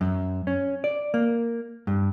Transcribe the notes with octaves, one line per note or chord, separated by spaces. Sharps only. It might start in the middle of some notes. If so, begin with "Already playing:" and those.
F#2
C#4
D5
A#3
G2